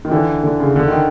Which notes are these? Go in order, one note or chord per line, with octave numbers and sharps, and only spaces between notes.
D#3
D3 E3
D3
C#3
D3
D#3